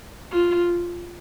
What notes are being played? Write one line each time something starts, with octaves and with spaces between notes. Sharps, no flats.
F4